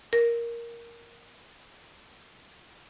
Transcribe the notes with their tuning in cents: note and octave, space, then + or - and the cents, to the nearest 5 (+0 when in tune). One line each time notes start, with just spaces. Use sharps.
A#4 +5